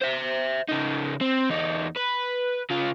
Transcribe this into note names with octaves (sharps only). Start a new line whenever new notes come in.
C5 E5
C#3 D#4
C4
E2 D#4
B4
C#3 F4